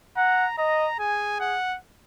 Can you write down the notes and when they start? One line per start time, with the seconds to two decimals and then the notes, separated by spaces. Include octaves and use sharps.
0.16 F#5 A#5
0.58 D#5 A#5
0.99 G#4 G#5
1.40 F#5